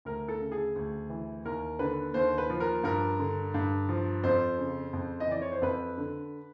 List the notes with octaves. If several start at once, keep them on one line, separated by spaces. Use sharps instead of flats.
D2 A#4
A4
C#3
G#4
D2
E3
D#2 A#4
D3 B4
D#2 C5
B4
F3
A#4
G2 A#4
D3
G2
F3
F2 C5
C#3
F2
D#5
E3 D5
C#5
C5
F2 B4
D3